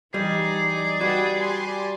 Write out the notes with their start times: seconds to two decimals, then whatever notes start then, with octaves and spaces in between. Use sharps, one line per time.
0.14 E3 G3 D#4 G#4 D5
1.01 G3 F#4 B4 G5 D#6
1.35 G4 G#5 C6